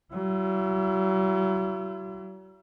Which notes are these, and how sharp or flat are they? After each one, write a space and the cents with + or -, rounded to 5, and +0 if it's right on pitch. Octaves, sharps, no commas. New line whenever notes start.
F#3 +45 E4 +45